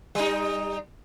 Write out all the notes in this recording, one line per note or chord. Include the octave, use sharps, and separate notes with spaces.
G3 D#4